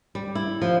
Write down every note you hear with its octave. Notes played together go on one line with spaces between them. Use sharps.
G3
E4
F3